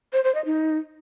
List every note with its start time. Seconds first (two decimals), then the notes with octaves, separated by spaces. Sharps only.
0.13 C5
0.24 C5
0.35 D#5
0.45 D#4